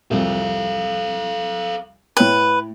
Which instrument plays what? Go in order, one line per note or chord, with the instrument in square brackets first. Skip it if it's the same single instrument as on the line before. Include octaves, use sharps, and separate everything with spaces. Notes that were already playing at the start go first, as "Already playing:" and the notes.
[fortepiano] C2 F2 [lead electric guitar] A4 F5
[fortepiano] A2 C#5 G5 [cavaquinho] B4